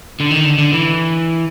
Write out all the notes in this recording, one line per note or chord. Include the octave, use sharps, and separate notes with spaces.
D3
D#3
D3
D3
E3